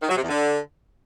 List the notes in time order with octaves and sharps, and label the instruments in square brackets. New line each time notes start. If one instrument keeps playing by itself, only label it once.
[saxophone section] D#3
F#3
C3
E2
D3